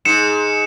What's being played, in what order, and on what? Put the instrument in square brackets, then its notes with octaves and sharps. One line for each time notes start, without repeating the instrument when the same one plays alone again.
[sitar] G#2 [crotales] C#7 E7